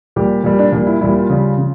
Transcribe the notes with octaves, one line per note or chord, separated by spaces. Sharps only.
A#2 G3 G4
A#2 G3
D4
A#2 G3 D4
E4
A#2 G3 E4
F4
C#3 G3
C#3